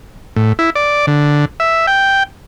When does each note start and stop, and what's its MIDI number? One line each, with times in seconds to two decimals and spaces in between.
0.36 0.53 45
0.59 0.70 64
0.76 1.06 74
1.07 1.45 50
1.60 1.86 76
1.87 2.23 79